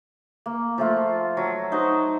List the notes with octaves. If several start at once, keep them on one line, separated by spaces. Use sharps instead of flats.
A#3
F3 A3 F4
F#3
D#4 F#4 C5